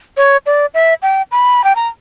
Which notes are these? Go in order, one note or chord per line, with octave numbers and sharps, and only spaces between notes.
C#5
D5
E5
G5
B5
G5
A#5